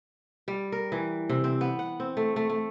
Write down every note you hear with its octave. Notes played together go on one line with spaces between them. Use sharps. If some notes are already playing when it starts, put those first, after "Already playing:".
G3
A#4
E3
C3
C4
B3
F#5
C4
A3
A3
A3